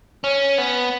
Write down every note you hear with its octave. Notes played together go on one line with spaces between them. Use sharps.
C#4
B3